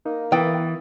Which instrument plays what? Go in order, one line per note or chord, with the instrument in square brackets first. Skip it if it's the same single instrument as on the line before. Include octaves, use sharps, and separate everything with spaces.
[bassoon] A#3 [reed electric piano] D#4
[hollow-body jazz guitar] E3 [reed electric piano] B3 D#6 A6 [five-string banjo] G5